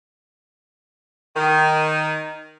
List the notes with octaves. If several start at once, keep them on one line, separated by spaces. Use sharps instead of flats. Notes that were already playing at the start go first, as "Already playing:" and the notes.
D#3